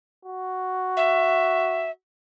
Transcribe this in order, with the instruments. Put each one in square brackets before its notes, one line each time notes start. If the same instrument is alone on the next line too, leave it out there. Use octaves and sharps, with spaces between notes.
[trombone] F#4
[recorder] E5